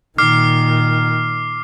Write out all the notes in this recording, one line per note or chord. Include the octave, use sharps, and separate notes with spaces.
A#2 D#3 D6 F6 C7